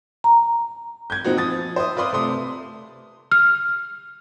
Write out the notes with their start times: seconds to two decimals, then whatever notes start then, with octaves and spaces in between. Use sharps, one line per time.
0.24 A#5
1.10 G6 G#6
1.24 A#2 C4 D#4 F#4
1.37 F3 D#6 A6
1.76 C5 E5 D#6
1.97 F4 B4 D5 C6 D#6
2.12 C3 A3 C6 D#6
3.31 F6